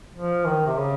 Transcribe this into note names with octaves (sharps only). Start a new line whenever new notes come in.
F3
D#3
C3
C#3